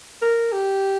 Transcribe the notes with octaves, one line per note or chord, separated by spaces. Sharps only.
A#4
G4